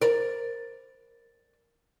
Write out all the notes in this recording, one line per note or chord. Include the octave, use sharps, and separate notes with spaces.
A#4 D5